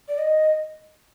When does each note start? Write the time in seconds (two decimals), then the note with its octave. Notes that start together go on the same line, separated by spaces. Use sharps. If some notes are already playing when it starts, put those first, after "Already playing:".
0.09 D5
0.18 D#5